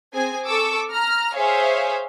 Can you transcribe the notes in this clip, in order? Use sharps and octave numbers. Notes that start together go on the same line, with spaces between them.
C4 G#4 G#5
A4 C#6 D6 E6
A#5 F6
G#4 C5 C#5 E5 F5